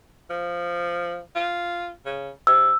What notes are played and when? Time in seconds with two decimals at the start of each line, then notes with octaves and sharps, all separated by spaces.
0.30 F3
1.35 F4
2.05 C#3
2.47 C3 E6